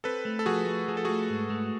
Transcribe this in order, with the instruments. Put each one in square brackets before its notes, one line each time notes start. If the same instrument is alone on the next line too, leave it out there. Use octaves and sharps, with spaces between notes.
[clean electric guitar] C4 [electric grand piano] A4 B4
[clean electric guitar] A3
[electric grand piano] A4
[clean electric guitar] F3 [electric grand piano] F#4 G#4
[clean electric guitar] A3
[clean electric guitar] F3 [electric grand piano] G#4
[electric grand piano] A4
[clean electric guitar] A3 [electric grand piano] F#4 G#4
[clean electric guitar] G#2
A3